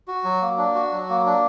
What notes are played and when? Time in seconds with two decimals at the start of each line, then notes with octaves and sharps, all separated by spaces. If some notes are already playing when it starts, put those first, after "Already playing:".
0.08 F#4
0.24 F#3
0.42 A#3
0.58 D4
0.75 F#4
0.92 F#3
1.09 A#3
1.26 D4